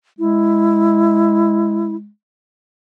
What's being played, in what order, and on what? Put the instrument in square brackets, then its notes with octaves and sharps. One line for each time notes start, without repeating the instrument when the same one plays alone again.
[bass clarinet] G#3 [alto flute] E4